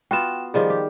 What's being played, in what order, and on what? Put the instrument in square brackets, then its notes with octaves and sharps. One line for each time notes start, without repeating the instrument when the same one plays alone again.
[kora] B3 F4 F#4 [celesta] G5 E7
[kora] D#3 F3 G3 [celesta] G#4
[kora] G4